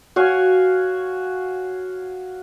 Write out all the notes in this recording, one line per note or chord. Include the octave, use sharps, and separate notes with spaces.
F#4 C#5 F5 G#5